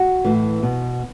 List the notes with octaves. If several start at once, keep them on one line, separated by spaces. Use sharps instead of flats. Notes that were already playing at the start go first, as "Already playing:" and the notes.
Already playing: F#4
A2 E3
B2